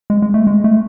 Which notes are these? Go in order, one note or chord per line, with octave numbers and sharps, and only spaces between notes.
G#3
G#3
A3
G#3
A3